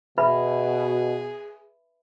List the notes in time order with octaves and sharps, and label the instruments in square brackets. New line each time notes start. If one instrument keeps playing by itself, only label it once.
[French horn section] B2 [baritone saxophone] G#4 [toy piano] B4 E5 B5